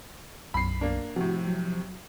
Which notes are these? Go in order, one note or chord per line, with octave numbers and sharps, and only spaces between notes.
B1 F#2 B5 C7
A#3 D4
A2 C3 F3 F#4
F#3